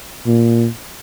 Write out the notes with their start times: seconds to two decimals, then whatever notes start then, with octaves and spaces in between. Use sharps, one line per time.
0.26 A#2